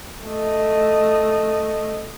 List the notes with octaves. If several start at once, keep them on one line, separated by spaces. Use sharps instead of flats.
A3 D#5